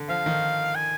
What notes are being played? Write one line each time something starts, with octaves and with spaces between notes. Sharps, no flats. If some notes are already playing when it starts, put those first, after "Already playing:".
Already playing: D3
F3 F5
D#3
G#5